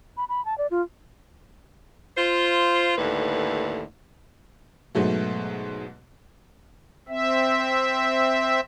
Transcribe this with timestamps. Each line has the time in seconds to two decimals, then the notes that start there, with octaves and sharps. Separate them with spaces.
0.17 B5
0.29 B5
0.45 A5
0.58 D5
0.71 F4
2.17 F4 C5
2.97 D#2 A2 D3 B4
4.95 G#2 B2 F#3 A3
7.08 C4 E5